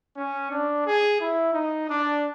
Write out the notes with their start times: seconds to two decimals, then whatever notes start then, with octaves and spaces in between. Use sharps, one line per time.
0.16 C#4
0.51 D4
0.85 G#4
1.19 E4
1.53 D#4
1.88 D4